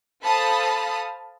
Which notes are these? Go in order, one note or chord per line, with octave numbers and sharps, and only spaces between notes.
A4 C5 F5 A5 B5 D#6